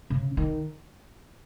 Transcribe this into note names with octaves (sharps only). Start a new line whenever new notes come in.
C#3
D#3